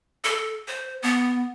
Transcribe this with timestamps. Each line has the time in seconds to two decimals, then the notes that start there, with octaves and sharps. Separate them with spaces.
0.24 A4
0.68 C5
1.03 B3